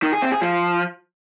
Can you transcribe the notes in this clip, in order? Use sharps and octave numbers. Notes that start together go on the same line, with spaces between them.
D#3
G#4
C4
G#4
F3